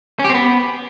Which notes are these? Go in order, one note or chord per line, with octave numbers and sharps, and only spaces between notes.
C#4
G4
C4
B3